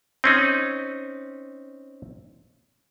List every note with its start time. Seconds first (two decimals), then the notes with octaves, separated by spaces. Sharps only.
0.24 C4 C#4 D#4